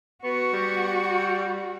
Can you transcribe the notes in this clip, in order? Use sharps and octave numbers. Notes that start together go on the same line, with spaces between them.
B3 F#4 C#6
G3